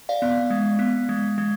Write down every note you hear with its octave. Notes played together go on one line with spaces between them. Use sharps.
D5 F5
B3
G#3
B3
G#3
G#3